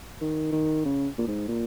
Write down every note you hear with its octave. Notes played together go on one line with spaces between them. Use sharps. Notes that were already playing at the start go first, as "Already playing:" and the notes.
D#3
D#3
C#3
A#2
G#2
A#2